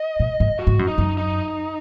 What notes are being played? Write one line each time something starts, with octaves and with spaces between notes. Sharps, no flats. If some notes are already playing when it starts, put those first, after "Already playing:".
Already playing: D#5
A#2
G#2
F#4
G#2
F#2
D#4
F#2
D#4